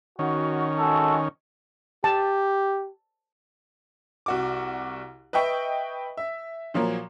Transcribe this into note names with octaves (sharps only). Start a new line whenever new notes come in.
D#3 C#4 F#4
G#3 F#4 A4
G4 A5
C2 F#4 D6
B4 D#5 E5 G5 C#6
E5
A#2 F3 F#3 A#3